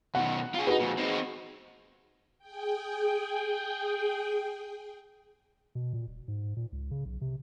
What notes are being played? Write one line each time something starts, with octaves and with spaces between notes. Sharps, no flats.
B2 D#3 F#5
F4 G#4
C4 D#4 F#4 G#4 B4
F2 A#2
C4 D#4
G#4 G5
B2
A#2
D#1
G#2
A#2
C#2
C#3
B1
C3